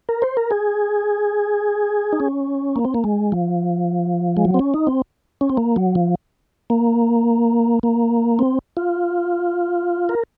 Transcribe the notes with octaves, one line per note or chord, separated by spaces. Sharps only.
A#4
C5
A#4
G#4
D#4
C#4
A#3
C4
A#3
G#3
F3
G#3
F#3
C4
C#4
D#4
C4
C#4
C4
A#3
F#3
F3
A#3
A#3
C4
F4
A#4